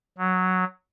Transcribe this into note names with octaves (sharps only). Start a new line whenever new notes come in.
F#3